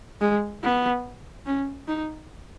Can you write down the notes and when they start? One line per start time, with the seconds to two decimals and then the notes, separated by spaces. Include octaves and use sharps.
0.21 G#3
0.63 B3
1.46 C#4
1.88 D#4